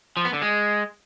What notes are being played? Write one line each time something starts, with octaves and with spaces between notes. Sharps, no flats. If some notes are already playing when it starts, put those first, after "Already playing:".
F3
B3
D3
G#3